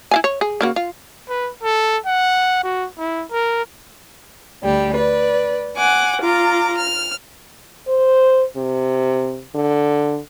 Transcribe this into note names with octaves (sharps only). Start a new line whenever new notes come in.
E4 F5 G#5
C#5
G#4
C#3 A#3 F#4
F4
B4
A4
F#5
F#4
E4
A#4
D2 G3 G4
B4 D5
F#5 G#5 D6
F4 A#5 D6
F6
C5
C3
D3